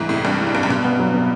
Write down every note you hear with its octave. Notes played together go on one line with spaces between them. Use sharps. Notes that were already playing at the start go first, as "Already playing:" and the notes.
Already playing: C2 G#2 E3
A2 C3
C2 G2
E3
G#2
C2 G2
F#2
G2 B2
B3
F#3
B2